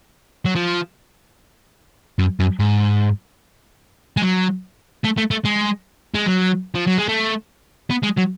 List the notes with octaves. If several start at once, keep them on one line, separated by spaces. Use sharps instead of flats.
F#3
F3
F#2
F#2
G#2
G#3
F#3
A3
A3
A3
G#3
G#3
F#3
F3
F#3
G#3
A3
B3
G#3
F#3